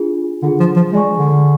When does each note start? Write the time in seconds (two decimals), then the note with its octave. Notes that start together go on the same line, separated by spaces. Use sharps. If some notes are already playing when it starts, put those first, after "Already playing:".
Already playing: D4 F4 G#4
0.42 D3 D4 F4 G#4
0.60 F3
0.76 F3
0.93 G#3 G#4 D5 G#5 C#6
1.18 D3